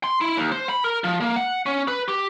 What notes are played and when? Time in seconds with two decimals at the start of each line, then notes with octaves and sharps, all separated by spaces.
0.04 C6
0.21 E4
0.37 D#2
0.52 C5
0.69 B5
0.84 A#4
1.04 F3
1.20 A#3
1.36 F#5
1.66 C#4
1.88 B4
2.08 G4